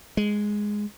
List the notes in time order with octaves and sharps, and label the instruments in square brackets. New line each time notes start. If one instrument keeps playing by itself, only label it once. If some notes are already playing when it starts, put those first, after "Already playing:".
[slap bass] G#3